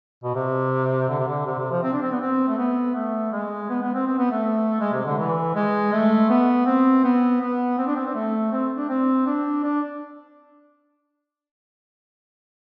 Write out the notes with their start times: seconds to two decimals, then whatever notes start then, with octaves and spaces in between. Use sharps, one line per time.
0.24 B2
0.35 C3
1.09 D3
1.19 C3
1.28 D3
1.46 C3
1.59 C3
1.71 F3
1.83 C4
1.93 D4
2.02 C4
2.11 B3
2.21 C4
2.48 A3
2.58 B3
2.95 A3
3.32 G#3
3.70 B3
3.82 B3
3.94 C4
4.07 C4
4.18 B3
4.31 A3
4.81 G#3
4.93 C3
5.05 D3
5.18 E3
5.55 G#3
5.93 A3
6.30 B3
6.66 C4
7.04 B3
7.41 B3
7.78 C4
7.87 D4
7.96 C4
8.06 C4
8.15 A3
8.53 C4
8.77 D4
8.89 C4
9.26 D4
9.64 D4